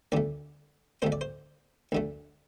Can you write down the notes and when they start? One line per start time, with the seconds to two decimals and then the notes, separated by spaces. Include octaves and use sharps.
0.12 D2 D3 A3 D5
1.02 D2 D3 A3 C5
1.12 D5
1.21 C5
1.92 D2 D3 A3